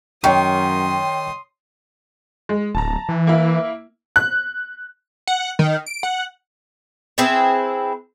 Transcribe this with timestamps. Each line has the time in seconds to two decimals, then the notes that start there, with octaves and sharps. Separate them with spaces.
0.24 F#2 D#3 C#5 G5 C6 C#6 D#6
2.49 G#3
2.75 D1 A5 A#5
3.09 E3
3.27 A#3 E4
4.16 F#6
5.27 F#5
5.59 D#3
5.86 D7
6.03 F#5
7.18 C4 E4 G#4 B4